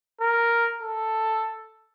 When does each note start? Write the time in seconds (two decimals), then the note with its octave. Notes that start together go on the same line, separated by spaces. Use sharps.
0.21 A#4
0.82 A4